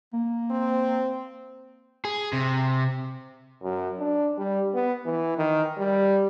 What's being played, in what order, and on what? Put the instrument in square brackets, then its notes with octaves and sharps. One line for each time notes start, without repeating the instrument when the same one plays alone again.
[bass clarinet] A#3
[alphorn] C4
[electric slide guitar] G#4
C3
[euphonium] F#2
D4
G3
B3
E3
D#3
G3